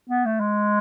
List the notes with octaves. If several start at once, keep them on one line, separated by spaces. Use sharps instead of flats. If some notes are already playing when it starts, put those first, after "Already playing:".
B3
A3
G#3